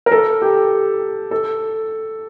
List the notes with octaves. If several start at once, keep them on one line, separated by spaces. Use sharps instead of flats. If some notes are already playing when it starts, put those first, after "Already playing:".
A#4
A4
G4
A4